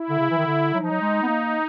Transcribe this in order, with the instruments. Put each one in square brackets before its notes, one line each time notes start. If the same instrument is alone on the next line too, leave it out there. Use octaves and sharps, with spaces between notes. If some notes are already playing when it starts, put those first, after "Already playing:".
Already playing: [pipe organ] E4
[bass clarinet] D3
C#3
E3
D#3
D3
[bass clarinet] F#3 [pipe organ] D#4
[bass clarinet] F3
F#3
G#3
B3
A#3